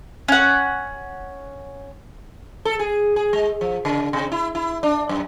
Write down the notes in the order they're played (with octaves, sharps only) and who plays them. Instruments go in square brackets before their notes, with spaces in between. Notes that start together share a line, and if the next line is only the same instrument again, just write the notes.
[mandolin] C#4 F#5
[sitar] A4
G#4
G#4
G#3
F3
C#3
C3
E4
E4
D4
F#2